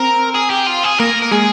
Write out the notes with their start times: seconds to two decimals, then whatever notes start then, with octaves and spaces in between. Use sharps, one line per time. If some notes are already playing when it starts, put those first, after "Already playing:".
Already playing: C4 A#4
0.34 G#4
0.50 G4
0.67 F4
0.83 G#4
0.98 A#3 A#4
1.22 A#4
1.31 G#3 G#4